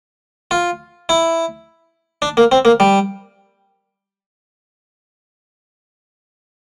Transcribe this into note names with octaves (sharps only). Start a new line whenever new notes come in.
F4
E4
D4
A#3
C4
A#3
G3